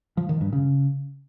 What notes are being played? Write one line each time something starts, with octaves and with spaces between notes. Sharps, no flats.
F3
D#3
G2
C#3